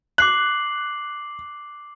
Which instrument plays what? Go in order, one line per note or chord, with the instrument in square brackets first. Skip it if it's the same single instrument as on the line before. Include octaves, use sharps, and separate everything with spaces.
[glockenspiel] D6 C7 F#7 [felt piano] F#6